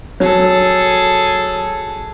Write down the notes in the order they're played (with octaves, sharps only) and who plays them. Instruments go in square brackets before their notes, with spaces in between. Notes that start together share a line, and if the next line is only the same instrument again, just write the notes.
[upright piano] F#3 [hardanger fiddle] G#4 A4